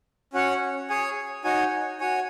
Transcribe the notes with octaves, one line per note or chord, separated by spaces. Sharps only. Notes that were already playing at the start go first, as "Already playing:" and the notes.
C#4 F#4 C#5 F#5
G#4 C#5 G#5
D#4 F#4 C#5 G#5
F#4 C#5 G#5